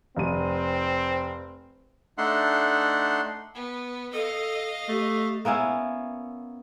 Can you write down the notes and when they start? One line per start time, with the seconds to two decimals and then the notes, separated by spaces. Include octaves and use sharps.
0.17 F1 C4 D#7
2.18 A3 D4 D#4 E5 F#5 C6
3.55 B3
4.13 A4 D#5 F5
4.88 A3 G4
5.45 A#3 B3 C#4 E4